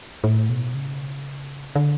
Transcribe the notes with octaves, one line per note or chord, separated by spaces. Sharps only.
A2
B2
C#3
D3